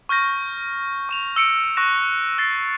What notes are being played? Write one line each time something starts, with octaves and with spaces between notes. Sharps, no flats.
C#6 F6 G6 A#6
C#6 E7 F7
E6 C#7 D7
C#6 F#6 A#6 E7
E6 A6 C7